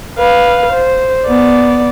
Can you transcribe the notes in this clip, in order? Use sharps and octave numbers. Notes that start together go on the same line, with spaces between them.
B4 F5
C5
B3 D5